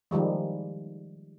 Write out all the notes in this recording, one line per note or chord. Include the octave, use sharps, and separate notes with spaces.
D#3 F3 G3 G#3